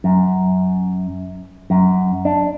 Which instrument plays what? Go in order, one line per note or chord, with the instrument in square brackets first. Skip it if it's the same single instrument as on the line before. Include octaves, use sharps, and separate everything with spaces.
[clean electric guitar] F#2
F#2
D4